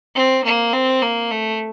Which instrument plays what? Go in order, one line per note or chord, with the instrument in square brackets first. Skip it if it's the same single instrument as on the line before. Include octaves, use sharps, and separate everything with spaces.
[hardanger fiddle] C4
A#3
C4
A#3
A3